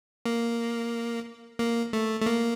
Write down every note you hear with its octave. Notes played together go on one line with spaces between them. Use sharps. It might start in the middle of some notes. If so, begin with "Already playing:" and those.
A#3
A#3
A3
A3
A#3